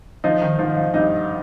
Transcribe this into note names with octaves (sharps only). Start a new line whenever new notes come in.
F3 D#4
D#3
G#2 F3
F3
G2 D#4